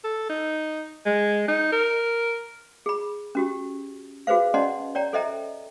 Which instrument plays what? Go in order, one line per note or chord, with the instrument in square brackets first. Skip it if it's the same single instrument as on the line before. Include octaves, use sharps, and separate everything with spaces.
[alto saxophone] A4
D#4
G#3
D#4
A#4
[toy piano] G#4 B5
C#4 F#4 G4
F#4 G#4 B4 C5 F5
C#4 D5 D#5 F#5 A5 C6
C#5 D5 G5 A#5
A4 C5 D#5 E5 G5 A#5